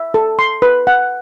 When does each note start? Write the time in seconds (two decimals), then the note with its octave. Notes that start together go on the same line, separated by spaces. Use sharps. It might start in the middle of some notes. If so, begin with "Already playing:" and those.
Already playing: E5
0.14 A4
0.39 C6
0.62 B4
0.87 F#5